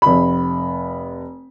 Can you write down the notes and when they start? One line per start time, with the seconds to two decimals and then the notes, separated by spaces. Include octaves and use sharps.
0.02 F1 B5